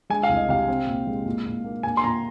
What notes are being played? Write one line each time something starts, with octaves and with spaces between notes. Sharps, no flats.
G#3 G#5
F5
C2
D#5
C3 F5
C4
A#2
G#3
A#2
A#2
A#3
A#2 G#5
C6
A#2 A#5